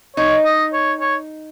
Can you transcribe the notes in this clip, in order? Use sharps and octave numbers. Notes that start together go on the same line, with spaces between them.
D#4 C#5
D#5
C#5
C#5